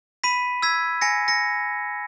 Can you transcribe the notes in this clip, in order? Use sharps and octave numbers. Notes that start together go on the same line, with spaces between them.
B5 B6 D#7
E6 G#6 B6
G#5 A#6 C#7
A#6 C#7